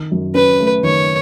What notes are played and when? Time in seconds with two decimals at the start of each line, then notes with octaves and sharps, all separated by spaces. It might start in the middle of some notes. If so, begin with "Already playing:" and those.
Already playing: D#3
0.12 F#2
0.35 C#4 B4
0.60 A3
0.83 D#3 C#5